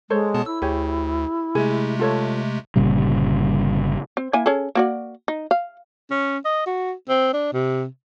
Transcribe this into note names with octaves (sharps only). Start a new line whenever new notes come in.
G#3 A4 C5 C#5
B2 B3 A5
E4 E6
D2 G4 G#4 C#5
C3 G#3 A3 G#4
F4 A4 C#5
G1 A#2 C#3 G3
C4
A#3 E4 G#5
C#4 G#4 A4
A#3 F#4 D5
D#4
F5
C#4
D#5
F#4
C4
D4
C3